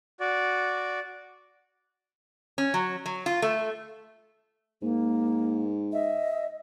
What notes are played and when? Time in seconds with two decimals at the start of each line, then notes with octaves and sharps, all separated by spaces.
0.20 F#4 D5
2.58 C#4
2.74 F#3
3.06 F#3
3.26 F4
3.42 A3
4.82 G#2 A#3
5.93 D#5 E5